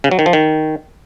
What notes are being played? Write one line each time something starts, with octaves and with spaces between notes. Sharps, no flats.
C#3
F#3
D#3
F3
D#3